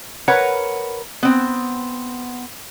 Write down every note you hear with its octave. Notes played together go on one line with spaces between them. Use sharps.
A#4 B4 C#5 F#5 A#5
B3 C4